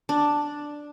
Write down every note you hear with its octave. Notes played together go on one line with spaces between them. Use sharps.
D4